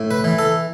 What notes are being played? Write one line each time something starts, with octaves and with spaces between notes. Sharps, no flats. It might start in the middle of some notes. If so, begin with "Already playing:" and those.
Already playing: A2
B4
E3
A4